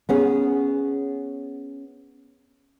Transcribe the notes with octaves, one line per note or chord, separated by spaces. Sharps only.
B3 C#4 G#4